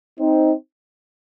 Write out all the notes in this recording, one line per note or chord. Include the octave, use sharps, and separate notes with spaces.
C4 D#4